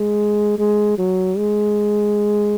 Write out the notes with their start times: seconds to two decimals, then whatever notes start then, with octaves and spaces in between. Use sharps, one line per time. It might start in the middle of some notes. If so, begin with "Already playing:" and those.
Already playing: G#3
0.59 G#3
0.99 F#3
1.38 G#3